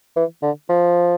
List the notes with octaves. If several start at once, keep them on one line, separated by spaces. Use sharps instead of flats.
E3
D3
F3